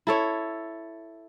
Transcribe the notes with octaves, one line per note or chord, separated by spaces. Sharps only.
E4 A4 C#5